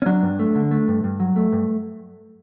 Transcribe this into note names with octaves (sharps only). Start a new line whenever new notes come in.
C#4
F#3 D4
G2
A3
D3
A3
G2
G2
F#3
A3
G2